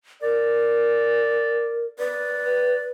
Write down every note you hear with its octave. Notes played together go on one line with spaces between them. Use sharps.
A#4 D5
B4 D5